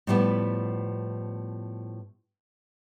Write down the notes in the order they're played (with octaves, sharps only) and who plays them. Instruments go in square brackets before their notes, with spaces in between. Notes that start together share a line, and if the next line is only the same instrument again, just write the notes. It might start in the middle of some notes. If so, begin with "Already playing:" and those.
[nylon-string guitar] A2 F3 G3 B3 E4